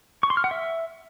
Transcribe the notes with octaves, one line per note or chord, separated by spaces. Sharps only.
C#6
C6
F6
F#5
E5